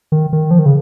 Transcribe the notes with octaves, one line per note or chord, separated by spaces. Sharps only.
D#3
D#3
F3
D#3
C#3